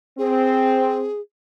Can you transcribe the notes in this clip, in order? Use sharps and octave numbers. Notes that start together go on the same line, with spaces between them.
C4 G#4